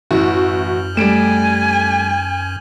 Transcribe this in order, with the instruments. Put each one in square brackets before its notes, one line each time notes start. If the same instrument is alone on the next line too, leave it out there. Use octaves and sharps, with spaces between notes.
[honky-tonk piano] A1 E4 F#4 [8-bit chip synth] F#2
[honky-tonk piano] G3 D7 E7 [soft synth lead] A3 [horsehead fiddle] G#5